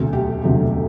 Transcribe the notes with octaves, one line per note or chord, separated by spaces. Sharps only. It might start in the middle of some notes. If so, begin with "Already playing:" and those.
Already playing: E1 D2 C3 F#3 A3 A4
G4
E1 D2 C3 F#3 A3